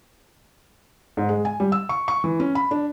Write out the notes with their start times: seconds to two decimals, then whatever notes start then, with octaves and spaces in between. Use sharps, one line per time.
1.17 G#2
1.29 G#3
1.45 G#5
1.60 G3
1.72 E6
1.89 C#6
2.08 C#6
2.24 E3
2.40 C#4
2.55 B5
2.71 D4